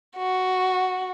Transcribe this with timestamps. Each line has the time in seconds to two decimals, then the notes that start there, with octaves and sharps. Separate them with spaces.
0.18 F#4